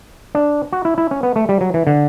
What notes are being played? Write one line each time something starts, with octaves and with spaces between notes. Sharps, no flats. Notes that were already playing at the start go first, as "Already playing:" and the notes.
D4
F#4
E4
E4
C#4
B3
A3
G3
F#3
E3
D3